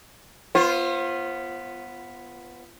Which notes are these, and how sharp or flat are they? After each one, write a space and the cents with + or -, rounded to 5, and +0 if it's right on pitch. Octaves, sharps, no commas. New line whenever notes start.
B3 +0 F4 -15 C5 +35